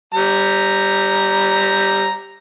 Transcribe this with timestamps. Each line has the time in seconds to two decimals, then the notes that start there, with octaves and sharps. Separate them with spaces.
0.14 G3 A#5